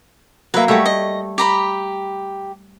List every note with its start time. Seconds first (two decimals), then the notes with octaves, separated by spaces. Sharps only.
0.54 F#3 A#3 B4 E5
0.68 G3 A3 F#4 C#5 E5
0.86 D#5
1.38 G4 A#5 B5